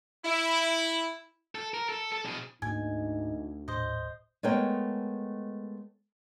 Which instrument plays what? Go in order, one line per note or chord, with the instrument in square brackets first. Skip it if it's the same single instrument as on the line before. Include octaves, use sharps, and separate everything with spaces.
[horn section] E4
[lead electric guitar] A4
A#4
A4
A4
B2 G#4
[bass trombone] D2 [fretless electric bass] G#2 A#3 [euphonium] D#4 [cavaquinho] G#5
[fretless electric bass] D#1 A2 [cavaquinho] C5 D#5
[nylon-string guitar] G#3 A3 B3 A#4 C#5 G5